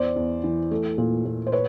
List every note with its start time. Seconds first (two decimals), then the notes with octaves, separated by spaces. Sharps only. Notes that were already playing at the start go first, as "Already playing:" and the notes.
Already playing: E2 C5 D5
0.16 E2
0.44 E3
0.71 A3
0.98 A#2
1.25 A#2
1.47 C5
1.52 B4 C#5